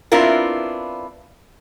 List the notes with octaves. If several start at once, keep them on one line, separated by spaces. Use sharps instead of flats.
B3 C4 D4 E4 F4 A#4